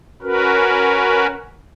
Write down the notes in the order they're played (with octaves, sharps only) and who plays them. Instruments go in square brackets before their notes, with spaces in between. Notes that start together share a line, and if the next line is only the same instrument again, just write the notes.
[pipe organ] C#4 F#4 A#4 B4